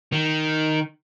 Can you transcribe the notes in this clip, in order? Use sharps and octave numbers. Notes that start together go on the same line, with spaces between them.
D#3